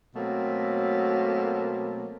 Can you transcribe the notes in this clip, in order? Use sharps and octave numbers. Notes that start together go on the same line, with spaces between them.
B2 F#3 A3 A#3 C4